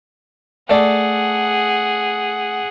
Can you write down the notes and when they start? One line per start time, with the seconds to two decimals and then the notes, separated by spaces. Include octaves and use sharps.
0.70 A3 G#4 D5 F#5